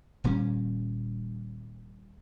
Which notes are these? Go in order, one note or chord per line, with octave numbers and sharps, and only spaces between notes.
D#1 A#2 G3 C#4